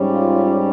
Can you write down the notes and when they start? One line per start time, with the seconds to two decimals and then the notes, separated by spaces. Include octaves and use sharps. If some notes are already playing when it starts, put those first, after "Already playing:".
Already playing: G#2 G3 C#4
0.11 F4